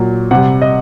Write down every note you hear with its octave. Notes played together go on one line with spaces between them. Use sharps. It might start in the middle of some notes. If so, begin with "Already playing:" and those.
Already playing: A#2 F#3
C3 G3 F#5
D#5